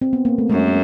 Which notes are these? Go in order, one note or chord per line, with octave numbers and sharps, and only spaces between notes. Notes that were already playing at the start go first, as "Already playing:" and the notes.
C4
B3
A#3
A3
F#2 G#3